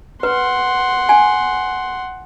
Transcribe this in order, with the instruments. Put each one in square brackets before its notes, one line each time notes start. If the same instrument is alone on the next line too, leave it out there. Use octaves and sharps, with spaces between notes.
[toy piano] B4 [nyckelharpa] F#5 C6
[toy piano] G#5